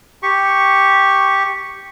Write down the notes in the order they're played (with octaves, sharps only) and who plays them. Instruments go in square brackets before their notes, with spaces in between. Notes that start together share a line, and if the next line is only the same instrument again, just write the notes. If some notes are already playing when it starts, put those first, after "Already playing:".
[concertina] G4 C#6